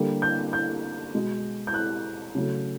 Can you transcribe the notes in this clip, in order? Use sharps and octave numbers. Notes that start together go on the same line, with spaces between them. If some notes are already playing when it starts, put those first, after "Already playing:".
Already playing: D3 G3 A#3
G6
G6
B2 G#3
G6
F#6
C#3 F#3 A3